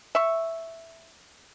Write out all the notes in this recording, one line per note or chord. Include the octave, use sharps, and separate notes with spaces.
E5 C#6